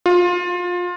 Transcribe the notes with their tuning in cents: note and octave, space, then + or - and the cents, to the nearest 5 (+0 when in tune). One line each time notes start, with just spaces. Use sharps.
F4 +25